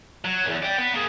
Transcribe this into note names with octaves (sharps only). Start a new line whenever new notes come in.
F#3
E2 G2
D5 G5
B3
A#3 G#4